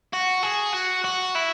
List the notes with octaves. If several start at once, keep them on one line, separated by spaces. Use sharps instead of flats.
F#4
G#4
F#4
F#4
E4